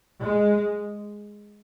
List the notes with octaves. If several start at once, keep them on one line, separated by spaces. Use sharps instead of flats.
G#3